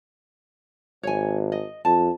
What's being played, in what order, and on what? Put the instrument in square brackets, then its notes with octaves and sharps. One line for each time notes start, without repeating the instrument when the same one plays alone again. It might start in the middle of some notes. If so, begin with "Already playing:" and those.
[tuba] G#1 [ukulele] C#5 G#5
[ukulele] D#5
[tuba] F2 [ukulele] A5